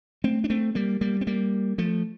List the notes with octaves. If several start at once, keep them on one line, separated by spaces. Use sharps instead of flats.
A3 C4
D4
A3 C4
G3 A#3
G3 A#3
C4
G3 A#3
F3 A3